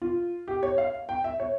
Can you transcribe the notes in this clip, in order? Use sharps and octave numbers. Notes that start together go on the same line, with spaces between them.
F4
G4
C#5
F5
G5
E5
C#5